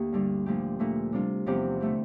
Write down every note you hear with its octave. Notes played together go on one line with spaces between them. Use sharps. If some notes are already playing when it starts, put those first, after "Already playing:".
Already playing: D2 A#3 G4
G2 D3 G3
A#2 F3 A3 D4 G4
A#2 A3 D4
C3 G3 D4 F4
E2 C3 F3 C4 G4
D3 A3 E4 G4